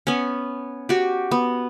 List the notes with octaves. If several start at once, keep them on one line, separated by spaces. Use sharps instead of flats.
B3 C#4
F#4 G4
B3